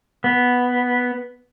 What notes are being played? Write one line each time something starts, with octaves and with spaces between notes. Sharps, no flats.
B3